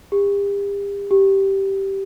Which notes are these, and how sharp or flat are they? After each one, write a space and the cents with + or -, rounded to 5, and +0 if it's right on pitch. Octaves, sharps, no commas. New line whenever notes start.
G4 +40
G4 -10